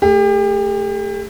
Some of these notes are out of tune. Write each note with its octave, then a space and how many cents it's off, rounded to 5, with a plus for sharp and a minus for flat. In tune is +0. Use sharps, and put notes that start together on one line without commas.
A3 +0 G4 +35